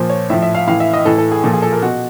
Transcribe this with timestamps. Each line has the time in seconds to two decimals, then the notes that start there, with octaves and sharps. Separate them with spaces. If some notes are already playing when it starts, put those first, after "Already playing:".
Already playing: A#2 F3 C5
0.10 C#5
0.30 A2 F3 E5
0.42 E5
0.55 F5
0.67 A2 E3 F5
0.80 E5
0.93 D#5
1.05 A2 E3 A4
1.18 A4
1.32 G#4
1.44 A#2 F3 A4
1.53 G#4
1.62 A4
1.72 A#4
1.82 B2 F#4